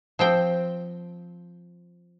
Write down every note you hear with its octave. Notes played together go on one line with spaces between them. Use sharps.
F3 C4 G5